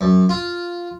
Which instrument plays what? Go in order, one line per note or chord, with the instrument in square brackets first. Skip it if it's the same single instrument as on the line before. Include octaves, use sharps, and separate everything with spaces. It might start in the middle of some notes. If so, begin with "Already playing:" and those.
[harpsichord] F#2
F4